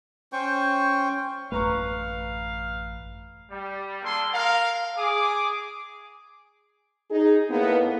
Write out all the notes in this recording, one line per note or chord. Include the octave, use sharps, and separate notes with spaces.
C#4 C5 G5 C#6
A1 F#2 A3 B4 F5 A#5 C#6
G3
G3 A#3 D4 G#4 A4 C6
A#4 F5
G#4 D6
D#4 G#4
A2 A#3 B3